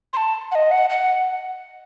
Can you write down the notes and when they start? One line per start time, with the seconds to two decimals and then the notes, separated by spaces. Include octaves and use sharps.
0.13 C6
0.17 A5
0.52 F#5
0.55 D#5
0.71 F#5
0.90 F#5